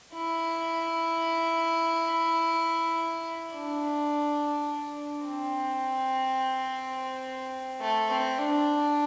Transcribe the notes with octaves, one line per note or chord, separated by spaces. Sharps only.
E4
D4
C4
A3
C4
D4